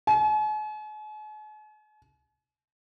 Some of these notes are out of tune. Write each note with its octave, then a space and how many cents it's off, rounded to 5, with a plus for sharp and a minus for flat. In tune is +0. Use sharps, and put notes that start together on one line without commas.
G#5 +45